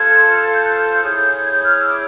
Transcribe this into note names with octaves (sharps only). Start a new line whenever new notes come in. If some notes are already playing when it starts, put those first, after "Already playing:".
Already playing: F4 A4 C5 G#6
G6
F#6
G6
E4 G#4 C#5
G#6
G6
F6
E6
D6